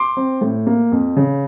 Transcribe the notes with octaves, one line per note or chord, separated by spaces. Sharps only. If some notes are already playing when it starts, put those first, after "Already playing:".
Already playing: C6 D6
C4
A2
A#3
F2
C#3